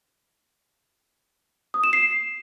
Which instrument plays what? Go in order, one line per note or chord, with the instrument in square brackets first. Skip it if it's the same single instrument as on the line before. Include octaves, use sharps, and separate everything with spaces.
[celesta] D#6
E7
C7